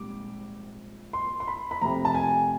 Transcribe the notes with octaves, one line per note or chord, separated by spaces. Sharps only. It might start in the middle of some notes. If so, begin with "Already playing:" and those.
Already playing: A#1 G#2 G3 C4 D6
C6
C6
B5
B5
F1 F2 C3 A#5
A5
G#5